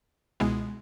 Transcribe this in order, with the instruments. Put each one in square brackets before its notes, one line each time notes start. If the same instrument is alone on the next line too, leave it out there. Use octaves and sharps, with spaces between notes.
[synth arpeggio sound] C#2 B2 G#3 B3 E4